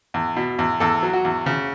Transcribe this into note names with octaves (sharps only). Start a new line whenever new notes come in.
E2
B2
E2
E2 A4
F#3
F#4
E2
C#3